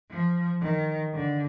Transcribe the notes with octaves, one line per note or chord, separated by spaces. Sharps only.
F3
D#3
D3